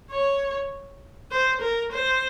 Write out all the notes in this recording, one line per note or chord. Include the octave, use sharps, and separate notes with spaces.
C#5
C5
A#4
C5